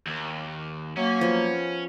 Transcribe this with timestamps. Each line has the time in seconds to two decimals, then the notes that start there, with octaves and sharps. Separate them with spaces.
0.07 D#2
0.97 F#3 A#3 C#4
1.21 F3 B3